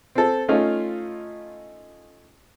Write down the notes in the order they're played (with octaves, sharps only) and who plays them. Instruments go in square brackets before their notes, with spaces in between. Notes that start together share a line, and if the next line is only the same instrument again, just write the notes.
[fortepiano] C4 A4
A3 C#4 D#4 F4